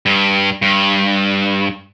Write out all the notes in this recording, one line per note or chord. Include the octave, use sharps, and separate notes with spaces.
G2
G2